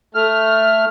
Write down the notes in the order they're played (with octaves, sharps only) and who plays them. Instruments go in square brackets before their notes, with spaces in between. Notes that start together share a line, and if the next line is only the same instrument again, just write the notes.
[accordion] A3 F6